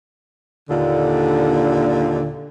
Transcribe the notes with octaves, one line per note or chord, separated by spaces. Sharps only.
D#2 A#2 D3